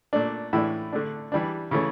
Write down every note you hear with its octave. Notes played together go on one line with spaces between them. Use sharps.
A#2 A3 D4
A2 E3 A3 D4 E4
D3 A3 D4
E3 G3 D4
C#3 E3 A3 C#4